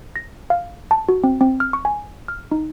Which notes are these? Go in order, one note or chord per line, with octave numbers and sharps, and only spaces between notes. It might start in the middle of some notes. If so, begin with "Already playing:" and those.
A#6
F5
A5
F#4
C4
C4
F6
C#6
G#5
F6
D#4